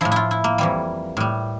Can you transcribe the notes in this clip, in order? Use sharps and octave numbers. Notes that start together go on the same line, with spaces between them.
A2 F3 E4
E4 F4
E4
A#3
F2 E3 G3
A2 G3